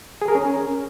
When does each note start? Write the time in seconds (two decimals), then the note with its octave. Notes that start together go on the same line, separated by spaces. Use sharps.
0.22 G#4
0.28 A#4
0.35 C#4